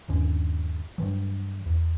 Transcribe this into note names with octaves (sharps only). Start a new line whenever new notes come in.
G1 D#2 D3 C#4
G2 E3 F#3
E2